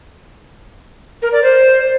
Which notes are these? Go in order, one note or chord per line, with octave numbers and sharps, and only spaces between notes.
A#4
D5
C5